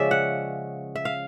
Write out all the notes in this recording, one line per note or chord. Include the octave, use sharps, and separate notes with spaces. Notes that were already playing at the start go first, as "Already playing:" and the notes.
Already playing: C#3 F3 G#3 C#4 D5 E5
F#5
E5
F5